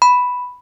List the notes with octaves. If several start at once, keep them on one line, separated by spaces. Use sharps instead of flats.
B5